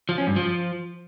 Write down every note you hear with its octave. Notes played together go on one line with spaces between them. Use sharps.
F3
C#4
G2
F3